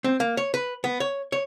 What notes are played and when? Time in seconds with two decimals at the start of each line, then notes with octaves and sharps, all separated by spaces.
0.04 C4
0.20 A#3
0.37 C#5
0.54 B4
0.84 B3
1.00 C#5
1.32 C#5